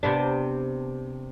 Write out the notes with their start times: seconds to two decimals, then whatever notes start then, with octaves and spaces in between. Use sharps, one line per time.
0.03 C3 B3 D4